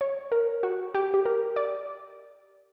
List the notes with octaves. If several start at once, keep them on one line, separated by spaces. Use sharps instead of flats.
C#5
A#4
F#4
G4
G4
A#4
D5